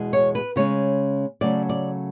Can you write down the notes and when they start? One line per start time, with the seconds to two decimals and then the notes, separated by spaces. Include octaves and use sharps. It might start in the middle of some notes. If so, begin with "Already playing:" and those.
Already playing: E2 B2 G#3
0.13 C#5
0.35 B4
0.56 C#3 G#3 C#4 C#5
1.41 C#3 F#3 A3 C#4 D5
1.69 D5